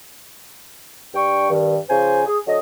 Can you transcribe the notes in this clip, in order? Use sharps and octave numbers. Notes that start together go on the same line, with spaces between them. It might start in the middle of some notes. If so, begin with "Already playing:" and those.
G2 D4 G5 C#6
G2 D#3
C#3 F3 C5 G#5
G#4
D3 F#3 D#5